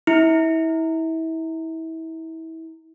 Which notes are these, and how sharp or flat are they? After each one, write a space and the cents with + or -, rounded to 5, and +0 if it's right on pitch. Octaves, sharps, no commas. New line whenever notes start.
E4 -30